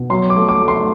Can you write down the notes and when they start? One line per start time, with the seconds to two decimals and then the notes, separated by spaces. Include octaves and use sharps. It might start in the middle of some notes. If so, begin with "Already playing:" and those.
Already playing: B2
0.10 F#3 C6
0.30 D6
0.36 A3
0.49 D6
0.61 A3
0.68 C6